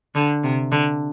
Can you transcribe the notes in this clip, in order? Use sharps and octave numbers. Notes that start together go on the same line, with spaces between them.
D3
C3
D3